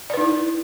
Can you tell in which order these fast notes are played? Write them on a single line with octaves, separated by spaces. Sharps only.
D5 B4 D#4 E4